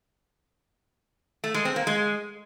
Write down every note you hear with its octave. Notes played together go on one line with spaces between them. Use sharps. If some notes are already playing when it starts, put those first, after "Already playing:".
A3
G#3
C4
A#3
G#3